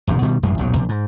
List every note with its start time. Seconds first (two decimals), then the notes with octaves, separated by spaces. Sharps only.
0.07 D#1 A#1 G#2 C3
0.22 B2 D#3 E3 G3
0.43 A1 F#2 B2 G#3
0.58 D#1 B1 G#2 F#3
0.77 A#1 C3
0.89 G#2